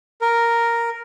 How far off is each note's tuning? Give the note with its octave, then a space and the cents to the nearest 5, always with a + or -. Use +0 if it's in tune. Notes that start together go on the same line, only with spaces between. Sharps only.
A#4 +0